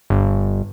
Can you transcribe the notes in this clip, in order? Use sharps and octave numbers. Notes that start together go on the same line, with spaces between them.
G1